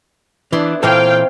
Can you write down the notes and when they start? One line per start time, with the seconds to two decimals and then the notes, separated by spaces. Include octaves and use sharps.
0.53 E3 B3 D4 E4 C6
0.83 A#2 E3 C4 F4 A4 C#5 F5 G5